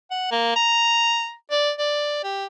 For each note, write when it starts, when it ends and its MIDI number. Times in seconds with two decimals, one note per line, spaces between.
0.11 0.31 78
0.31 0.54 58
0.56 1.34 82
1.51 1.72 74
1.79 2.20 74
2.24 2.45 67